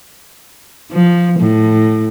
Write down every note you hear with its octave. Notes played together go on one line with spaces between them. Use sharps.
F3
A2